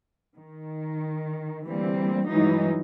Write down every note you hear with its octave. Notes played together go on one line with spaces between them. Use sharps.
D#3
D2 E3 G3 A#3 C4
G2 E3 F#3 G#3 D#4